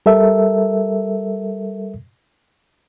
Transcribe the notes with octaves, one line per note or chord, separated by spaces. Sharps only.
G3 A4 A#4 E5